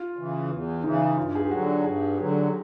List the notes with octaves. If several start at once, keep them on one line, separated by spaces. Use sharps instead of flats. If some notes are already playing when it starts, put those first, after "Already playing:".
Already playing: F4
C#3 E3
E2
C#3 E3 D#4
G2 F4
G#4
G4
D3 F#3 F#4
G2 G#4
D3 F#3 G4